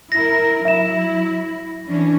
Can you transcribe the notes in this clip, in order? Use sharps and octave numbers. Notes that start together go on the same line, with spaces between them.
E4 A#4 A#6
F#3 E4 E5 E7
E3 C#4 D4